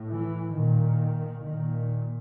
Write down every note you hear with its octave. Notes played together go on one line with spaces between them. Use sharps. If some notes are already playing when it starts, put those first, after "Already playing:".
Already playing: A2
E3
A#2 D#3
A#2 D#3